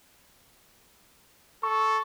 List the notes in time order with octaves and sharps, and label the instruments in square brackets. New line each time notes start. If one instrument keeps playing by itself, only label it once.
[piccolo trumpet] A4 [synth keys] C#6